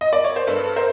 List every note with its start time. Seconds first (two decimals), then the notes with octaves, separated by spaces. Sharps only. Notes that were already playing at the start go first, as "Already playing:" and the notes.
0.01 D#5
0.13 D5
0.24 C#5
0.36 C5
0.47 G2 A4 B4
0.76 A#4 C5